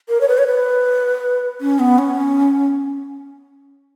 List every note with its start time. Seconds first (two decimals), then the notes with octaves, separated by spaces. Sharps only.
0.09 A#4
0.21 C#5
0.28 B4
0.38 C#5
0.47 B4
1.61 C#4
1.79 B3
1.98 C#4